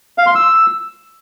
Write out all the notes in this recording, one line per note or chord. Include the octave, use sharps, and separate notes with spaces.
F5
C6
E6